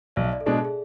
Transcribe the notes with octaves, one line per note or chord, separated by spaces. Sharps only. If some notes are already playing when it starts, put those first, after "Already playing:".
B1 D5
E5
D5
A4
B2 G#3 D4 G#4
G#4